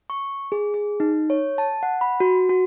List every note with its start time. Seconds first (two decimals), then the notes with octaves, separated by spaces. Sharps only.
0.10 C#6
0.52 G#4
0.74 G#4
1.00 D#4
1.30 C#5
1.58 A5
1.83 F#5
2.01 B5
2.20 F#4
2.49 F#4